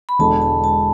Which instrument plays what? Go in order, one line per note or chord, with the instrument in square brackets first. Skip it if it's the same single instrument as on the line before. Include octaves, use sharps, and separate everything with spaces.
[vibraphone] B5
[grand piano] E1 E2 D3 G#3 [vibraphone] A5
[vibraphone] A5
A5